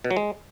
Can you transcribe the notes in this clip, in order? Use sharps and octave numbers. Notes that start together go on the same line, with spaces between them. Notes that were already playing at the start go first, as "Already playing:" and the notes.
B2
F#3
G#3